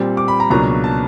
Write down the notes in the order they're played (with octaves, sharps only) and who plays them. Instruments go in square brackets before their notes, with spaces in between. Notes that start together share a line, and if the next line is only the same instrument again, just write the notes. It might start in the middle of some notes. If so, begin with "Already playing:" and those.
Already playing: [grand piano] A#2 G3 C4
D6
B5
A#5
C#2 B2 F#3 A#3 D4 A#5
A5